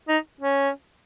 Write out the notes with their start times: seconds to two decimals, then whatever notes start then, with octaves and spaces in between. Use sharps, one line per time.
0.08 D#4
0.41 C#4